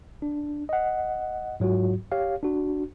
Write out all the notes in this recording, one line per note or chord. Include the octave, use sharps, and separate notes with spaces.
D4
D#5 F#5
G#2 F#3 F4 F#4
G4 C#5 F5
D4 F#4